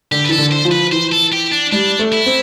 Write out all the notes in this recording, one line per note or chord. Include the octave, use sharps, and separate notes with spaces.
D3 G4
B4
E3 A4
D3
C5
F3
B4
E3 C5
A4
G4
D4
G3 D4
A3
E4
C4